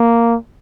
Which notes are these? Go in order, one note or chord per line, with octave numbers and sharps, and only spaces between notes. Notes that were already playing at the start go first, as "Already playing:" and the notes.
Already playing: A#3